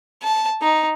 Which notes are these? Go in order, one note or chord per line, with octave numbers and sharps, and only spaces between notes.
A5
D#4